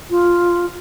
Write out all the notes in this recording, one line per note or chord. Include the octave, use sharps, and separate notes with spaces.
F4